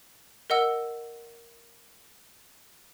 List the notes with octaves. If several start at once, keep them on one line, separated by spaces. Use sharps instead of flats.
A#4 D#5 F#5 E6